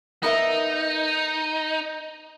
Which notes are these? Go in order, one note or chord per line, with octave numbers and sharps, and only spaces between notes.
B3 D#4 A#4 E5